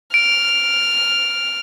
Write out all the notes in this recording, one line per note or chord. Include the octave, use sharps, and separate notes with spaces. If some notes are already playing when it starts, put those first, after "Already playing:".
F6 D7